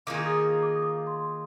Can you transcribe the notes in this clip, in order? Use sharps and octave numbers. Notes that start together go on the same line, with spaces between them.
D#3 A#3 F4 G#4 D6
D6
D#6
D6
D6
D#6
D6
C6